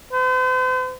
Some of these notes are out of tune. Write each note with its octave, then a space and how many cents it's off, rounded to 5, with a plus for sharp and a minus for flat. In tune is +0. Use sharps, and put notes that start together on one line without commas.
C5 -45